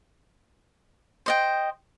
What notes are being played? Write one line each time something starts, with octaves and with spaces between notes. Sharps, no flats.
C5 D#5 G5